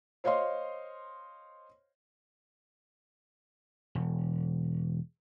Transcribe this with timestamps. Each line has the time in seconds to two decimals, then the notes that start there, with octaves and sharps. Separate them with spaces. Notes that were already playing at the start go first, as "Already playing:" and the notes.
0.24 C5 C#5 D#5 F5 C6
3.95 E1